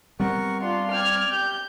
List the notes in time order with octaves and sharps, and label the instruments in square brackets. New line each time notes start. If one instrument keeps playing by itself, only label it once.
[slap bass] G3 B3 C4 [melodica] A#4 F#5 C#6
[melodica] D4 C6 [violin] F4
[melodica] D5 G5 [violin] F6 G#6
[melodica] G4 [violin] G6